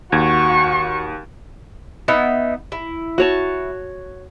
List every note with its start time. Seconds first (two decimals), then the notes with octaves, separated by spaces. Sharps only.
0.12 D#2 F#4 C#6 G#6
2.08 B3 D#4 E5
2.72 E4
3.18 F#4 C#5 A5